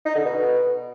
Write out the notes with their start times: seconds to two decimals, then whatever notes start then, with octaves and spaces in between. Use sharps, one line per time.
0.05 D#4
0.15 D3
0.25 B2